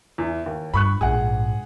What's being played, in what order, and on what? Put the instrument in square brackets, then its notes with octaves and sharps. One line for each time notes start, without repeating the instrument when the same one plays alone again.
[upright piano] E2
D#2
[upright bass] G2 [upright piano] B5 C#6 F#6
[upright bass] A#1 G#2 [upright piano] G#4 F#5